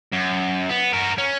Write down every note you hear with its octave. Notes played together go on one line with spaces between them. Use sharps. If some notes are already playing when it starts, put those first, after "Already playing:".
F#2
B3
F#4 A#4
C#4